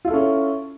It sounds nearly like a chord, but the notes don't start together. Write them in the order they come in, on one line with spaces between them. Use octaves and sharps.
F4 E4 A4 C#4